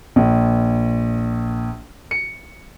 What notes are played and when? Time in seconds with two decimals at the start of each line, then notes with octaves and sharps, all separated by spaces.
0.16 A#1
2.11 C#7